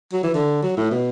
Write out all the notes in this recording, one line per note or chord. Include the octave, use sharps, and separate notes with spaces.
F#3
E3
D3
F#3
A2
B2